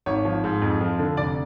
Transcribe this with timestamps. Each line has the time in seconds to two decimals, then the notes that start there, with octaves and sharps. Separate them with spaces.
0.06 G#1 C#5
0.25 F3
0.44 G#2
0.62 F2
0.81 F3
0.99 D3
1.17 F1 D5